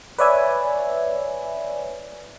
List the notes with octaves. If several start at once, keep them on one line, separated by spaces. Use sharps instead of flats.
B4 C#5 D5 E5 G#5